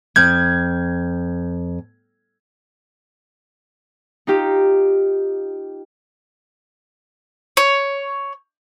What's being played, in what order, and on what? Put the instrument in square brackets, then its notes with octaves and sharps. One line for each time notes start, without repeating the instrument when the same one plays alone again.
[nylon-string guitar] F2 [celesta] F6 G6 [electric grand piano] G#6
[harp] D#4 F4 G4
[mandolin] C#5